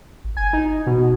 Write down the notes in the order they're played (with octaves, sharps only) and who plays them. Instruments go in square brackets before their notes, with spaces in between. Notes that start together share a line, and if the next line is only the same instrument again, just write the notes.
[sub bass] A1
[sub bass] G1 [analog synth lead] G#5
[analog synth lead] D#4
B2